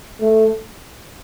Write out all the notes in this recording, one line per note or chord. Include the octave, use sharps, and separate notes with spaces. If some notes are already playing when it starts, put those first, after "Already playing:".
A3